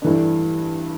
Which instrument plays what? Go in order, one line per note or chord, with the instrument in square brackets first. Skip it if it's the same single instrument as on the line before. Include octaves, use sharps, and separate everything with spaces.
[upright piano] G2 E3 A3 D4